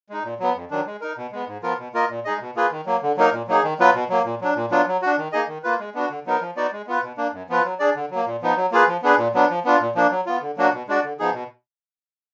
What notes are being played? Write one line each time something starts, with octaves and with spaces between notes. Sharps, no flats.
G#3 D#4
A#2
F#3 B3
F2
D#3 F#3 D4
G#3
D#4 A#4
B2
G#3 B3
G#2
F3 B3 F4 A#4
B2
A#3 F4 A#4 D#5
A#2
G#3 D#4 G#4 D#5
B2
A#3 F4 G#4 B4
D#3
F#3 A#3
D3
F#3 A#3 D#4 A#4
A#2
F#3 A#3 D#4 G#4
D#3
F#3 B3 F4 B4
B2
F#3 A#3
A#2
F#3 D4
A#2
F#3 B3 D4 F4
F#3
D4 F#4
D#3
A#3 D#4 G#4 D#5
D#3
A#3 F4 B4
G#3
B3 D4 F#4
D3
F#3 B3 D#4 A#4
F3
B3 D#4 F#4 D5
G#3
B3 F4 B4
B2
A#3 D4
F#2
F3 B3 F4 B4
F#3
D4 G#4 D5
D3
F#3 A#3
A#2
F3 B3 D#4
F#3
A#3 F4 G#4 B4
F3
B3 D4 G#4 B4
A#2
F#3 B3 D4
F3
B3 D4 F4
A#2
F3 A#3 D4
F#3
B3 F4
D3
F#3 A#3 D4 F#4
B2
G#3 D4 F#4 D5
D3
F3 B3 D#4 G#4
B2